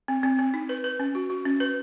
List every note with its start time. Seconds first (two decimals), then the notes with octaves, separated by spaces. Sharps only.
0.08 C4
0.23 C4
0.39 C4
0.54 D#4
0.69 B4
0.84 B4
1.00 C#4
1.15 F#4
1.30 F#4
1.45 C#4
1.60 B4